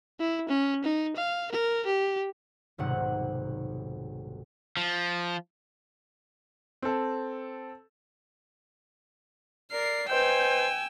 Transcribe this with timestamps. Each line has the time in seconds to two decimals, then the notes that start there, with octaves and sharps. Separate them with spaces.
0.20 E4
0.49 C#4
0.84 D#4
1.16 F5
1.52 A#4
1.86 G4
2.78 D#1 B1 G#2 C3 D#3 F#5
4.77 F3
6.82 C4 A4
9.72 A#4 D5 C7
10.10 B4 C5 D#5 G5 G#5 E6 G6